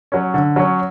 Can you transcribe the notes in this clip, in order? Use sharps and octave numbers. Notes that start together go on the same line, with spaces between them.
F#3 C#4
D3
F#3 C#4